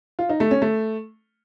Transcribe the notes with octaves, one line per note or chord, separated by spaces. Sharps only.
F4
D#4
A3
C#4
A3